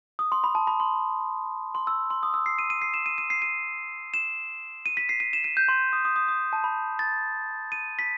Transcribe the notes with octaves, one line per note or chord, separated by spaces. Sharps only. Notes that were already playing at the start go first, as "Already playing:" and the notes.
D#6
C6
B5
A5
B5
C6
C6
E6
C6
D#6
E6
C7
D#7
D#7
C7
E7
D#7
D#7
C7
D#7
E7
D#7
B6
C7
D#7
E7
D#7
G6
C6
D#6
D#6
D#6
D#6
A5
B5
A6
D#7
B6